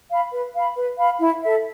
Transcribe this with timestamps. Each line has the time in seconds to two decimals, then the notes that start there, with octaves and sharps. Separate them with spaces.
0.10 F5 B5
0.31 B4
0.54 F5 B5
0.76 B4
0.98 F5 B5
1.21 E4
1.42 A4 E5